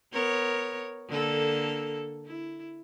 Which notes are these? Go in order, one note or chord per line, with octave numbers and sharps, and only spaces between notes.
B3 A#4 C#5
D3 A#3 A4
E4